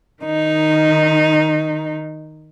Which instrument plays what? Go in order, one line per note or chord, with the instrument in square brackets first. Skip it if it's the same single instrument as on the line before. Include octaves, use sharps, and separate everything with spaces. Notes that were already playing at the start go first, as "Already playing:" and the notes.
[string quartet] D#3 D#4